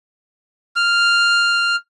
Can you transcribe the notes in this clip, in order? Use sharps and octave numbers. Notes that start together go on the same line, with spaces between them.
F6